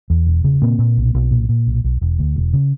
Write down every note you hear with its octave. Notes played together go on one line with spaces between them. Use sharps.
E2
E1
C#3
A#2 A#3 C4
A#2
B1
B1
A#2
A#2
B1
B1
E1
D2
E1
C#3